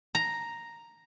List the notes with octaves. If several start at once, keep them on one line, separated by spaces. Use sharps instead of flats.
A#5